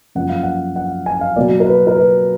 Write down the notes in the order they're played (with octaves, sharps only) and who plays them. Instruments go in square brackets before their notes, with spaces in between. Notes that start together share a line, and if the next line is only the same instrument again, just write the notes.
[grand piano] F#2 F3 A#3 F#5
F5
F#5
F#5
G#5
F5
B2 F#3 A#3 D5
A#4
B4
A#4
B4